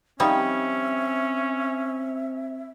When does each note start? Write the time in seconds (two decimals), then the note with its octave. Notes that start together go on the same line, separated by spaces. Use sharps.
0.20 F3 G3 C4 C#4 D#4 E5